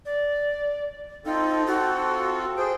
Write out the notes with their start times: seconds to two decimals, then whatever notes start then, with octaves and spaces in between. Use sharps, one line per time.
0.05 D5
1.25 C4 D#4 F4 A4
1.67 F#4
2.57 G#4 C5 G5